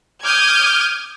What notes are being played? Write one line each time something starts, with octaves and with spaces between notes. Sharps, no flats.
D6 D#6 F6 G6 G#6